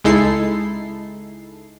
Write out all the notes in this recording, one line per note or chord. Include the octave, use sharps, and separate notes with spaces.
C#2 G#3 D#4 E4 A4 C7